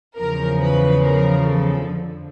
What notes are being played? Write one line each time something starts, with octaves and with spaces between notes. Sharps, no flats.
E2 C#3 F3 A#4
B4
A#4
A4
F2 D3 F3